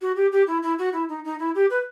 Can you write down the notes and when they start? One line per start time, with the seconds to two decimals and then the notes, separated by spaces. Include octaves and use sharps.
0.01 F#4
0.16 G4
0.32 G4
0.47 E4
0.63 E4
0.78 F#4
0.93 E4
1.09 D#4
1.24 D#4
1.39 E4
1.55 G4
1.70 B4